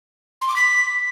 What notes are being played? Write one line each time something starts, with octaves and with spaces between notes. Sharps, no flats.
C6
D6
B6